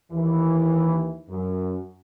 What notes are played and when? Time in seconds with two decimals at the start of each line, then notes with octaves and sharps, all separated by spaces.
0.12 D#2 E3
1.29 F#2